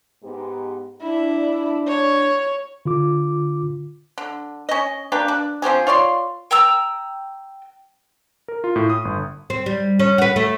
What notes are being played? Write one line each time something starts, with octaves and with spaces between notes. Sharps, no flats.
G#2 B3 G4
D4 E4
C#5
D3 F4 D6
D3
C#4 D#5
A#3 D4 G4 B4
D4
F3 C4 G4 G#4
F4 C#5 D5 C6
G5 A#5 E6
A#4
F4
A2
D#6
G1
C4
G3
C#4
F#4 B4
A3